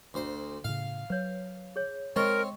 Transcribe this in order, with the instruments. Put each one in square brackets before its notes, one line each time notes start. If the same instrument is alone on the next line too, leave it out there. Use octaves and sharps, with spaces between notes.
[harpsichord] D2 C5
[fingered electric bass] A2 C#3 [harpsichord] F5
[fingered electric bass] F#3 [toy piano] B4 C#5
[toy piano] G#4 C#5
[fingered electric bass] G#3 [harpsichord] C4 C#5 [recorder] A#4 [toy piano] D#5 C#6